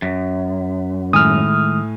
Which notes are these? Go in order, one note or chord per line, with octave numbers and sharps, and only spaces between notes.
F#2
A2 D#3 G#3 G#5 D#6 F6